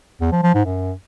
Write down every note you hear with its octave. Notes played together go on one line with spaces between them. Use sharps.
E2
F3
F3
G#2
F#2